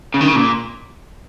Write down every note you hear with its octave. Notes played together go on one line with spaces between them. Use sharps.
C#3
D#3
C#3
A#2